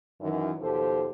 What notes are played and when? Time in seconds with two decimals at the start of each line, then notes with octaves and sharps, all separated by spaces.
0.21 F#2 D#3 E3
0.60 D#2 B2 F3 G4 A4 C5